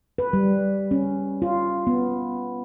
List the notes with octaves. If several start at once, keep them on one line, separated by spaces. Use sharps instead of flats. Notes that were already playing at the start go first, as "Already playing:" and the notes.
B4
G3
C#4
F4
B3